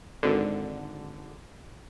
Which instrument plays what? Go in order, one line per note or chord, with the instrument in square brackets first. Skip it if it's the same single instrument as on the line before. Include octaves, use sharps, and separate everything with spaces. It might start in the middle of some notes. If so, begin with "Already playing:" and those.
[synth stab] G#1 D3